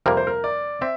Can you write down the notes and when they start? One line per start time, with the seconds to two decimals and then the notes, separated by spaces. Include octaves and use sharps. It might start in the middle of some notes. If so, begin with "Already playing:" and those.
0.06 F2 C3 G3 A#3 A#4
0.17 C5
0.27 A#4
0.44 D5
0.81 C4 E5